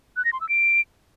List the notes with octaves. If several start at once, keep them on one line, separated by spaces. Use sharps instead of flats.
F#6
A#6
C6
E6
D7